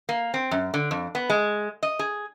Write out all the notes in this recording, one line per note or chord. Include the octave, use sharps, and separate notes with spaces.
A#3
C4
F#2
D3
F2
B3
G#3
D#5
G#4